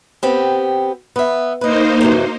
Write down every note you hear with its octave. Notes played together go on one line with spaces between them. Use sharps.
B3 C4 G4
B3 E5
A#3 D#4 B4 C5 D#5
F#2 C3 E3